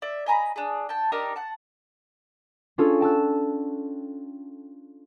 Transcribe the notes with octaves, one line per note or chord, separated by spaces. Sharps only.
D5 E5
D#5 G#5 A#5 B5
D4 G#4
G5 A5
D4 D#4 G4 A#4
F#5 A5
C#4 D4 F4 G#4 A4
G5 A5 E6 F#6